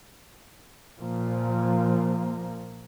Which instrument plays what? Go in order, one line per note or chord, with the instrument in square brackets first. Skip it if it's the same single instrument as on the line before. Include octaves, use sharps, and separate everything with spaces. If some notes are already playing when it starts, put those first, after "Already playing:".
[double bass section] A#2 F3 A#3